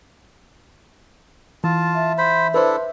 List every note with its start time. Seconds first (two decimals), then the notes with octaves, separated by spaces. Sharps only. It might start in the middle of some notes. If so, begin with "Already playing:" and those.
1.64 E3 F4 A5
1.94 E5
2.18 C5 B5
2.54 D4 E4 A4 B4 C5